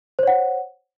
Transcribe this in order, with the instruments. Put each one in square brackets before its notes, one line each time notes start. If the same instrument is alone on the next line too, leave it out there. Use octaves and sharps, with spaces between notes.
[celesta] C5
C#5
F#5